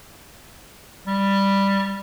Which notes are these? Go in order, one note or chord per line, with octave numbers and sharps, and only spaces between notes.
G3